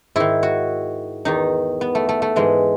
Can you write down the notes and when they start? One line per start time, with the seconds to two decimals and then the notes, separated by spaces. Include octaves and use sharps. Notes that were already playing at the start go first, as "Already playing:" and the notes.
0.16 G#2 D#3 E4
0.43 F#4
1.25 E2 D#3 D#4
1.81 B3
1.95 A3
2.09 A3
2.22 A3
2.36 G#2 E3 G#3